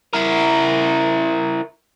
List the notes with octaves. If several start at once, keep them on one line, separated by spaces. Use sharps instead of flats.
E4 A#4